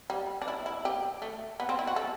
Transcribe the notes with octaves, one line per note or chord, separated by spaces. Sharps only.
G3
D4
E4
E4
G4
A3
B3
C4
E4
F#4
A4